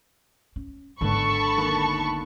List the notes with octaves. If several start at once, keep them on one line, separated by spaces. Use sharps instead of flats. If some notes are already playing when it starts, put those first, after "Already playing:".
C#4
G#1 D3 G#3 B3 A5 B5 C#6
D#2